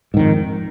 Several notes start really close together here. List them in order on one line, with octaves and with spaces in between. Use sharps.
G#2 D#3 F2